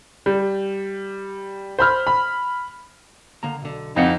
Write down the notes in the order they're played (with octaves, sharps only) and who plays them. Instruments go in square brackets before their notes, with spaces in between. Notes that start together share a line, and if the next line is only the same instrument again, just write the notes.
[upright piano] G3
C5 B5 F6
B5
[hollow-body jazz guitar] D3 A#3 A#5
B1 D3
[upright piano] F2 [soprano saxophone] D#4 [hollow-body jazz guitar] E4 F5 F#5